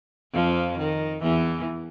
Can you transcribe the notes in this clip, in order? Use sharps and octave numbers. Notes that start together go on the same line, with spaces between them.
F2 F3
D#3
E2 E3